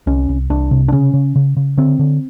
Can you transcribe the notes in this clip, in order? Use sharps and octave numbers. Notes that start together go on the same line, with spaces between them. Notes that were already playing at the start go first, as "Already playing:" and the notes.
C2 C#4
C2
C2 D4
C3
D4
C#3 C#4
C#3
C#3
C#3
D3 C4
D3